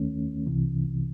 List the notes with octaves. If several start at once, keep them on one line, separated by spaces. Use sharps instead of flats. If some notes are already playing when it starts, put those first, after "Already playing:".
Already playing: D#2 D#3 A3 C#4
C2 C3 E3